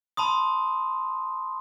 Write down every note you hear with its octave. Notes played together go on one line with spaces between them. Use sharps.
A5 B5 C6 D#6